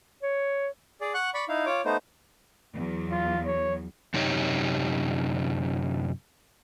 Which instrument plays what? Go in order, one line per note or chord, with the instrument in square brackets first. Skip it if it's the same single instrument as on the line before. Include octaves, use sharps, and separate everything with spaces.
[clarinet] C#5
[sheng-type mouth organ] G#4 D5
F#5 C#6 F#6
D5 B5 C#6
D#4 E4 F5
F4 C#5 D6
A3 B3 D#4 C5
[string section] E2 F#3
[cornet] F4
C#5
[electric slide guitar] F#2 C3 D#4 G4 C#5